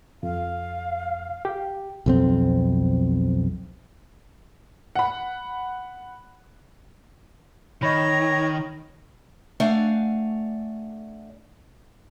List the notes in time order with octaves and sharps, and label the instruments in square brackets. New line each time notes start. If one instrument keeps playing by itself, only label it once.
[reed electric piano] F2 [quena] F5
[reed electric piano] G4
[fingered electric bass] B1 F2 C4
[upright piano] F#5 B5
[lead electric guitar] D#3 [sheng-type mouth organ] C#5 [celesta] D#5 B5 [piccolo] A#6
[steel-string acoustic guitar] A3 D4 D5 F5 F#5 G#5